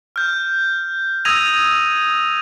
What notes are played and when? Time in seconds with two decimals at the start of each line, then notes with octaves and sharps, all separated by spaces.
0.16 F6 G6
1.25 D#6 E6 G#6 A#6 D#7 F7